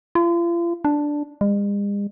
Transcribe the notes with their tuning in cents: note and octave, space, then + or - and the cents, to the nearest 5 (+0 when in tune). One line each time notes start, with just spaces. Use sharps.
F4 -40
D4 +0
G#3 -45